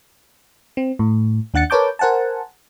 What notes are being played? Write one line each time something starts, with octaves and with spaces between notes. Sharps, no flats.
C4
A2
D#2 D4 F#5 A6 C#7
A#4 B4 C#5 A5 D6 G6
A#4 C5 F#5 G#5 A5